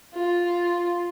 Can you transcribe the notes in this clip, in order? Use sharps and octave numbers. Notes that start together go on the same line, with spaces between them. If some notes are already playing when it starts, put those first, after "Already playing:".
F4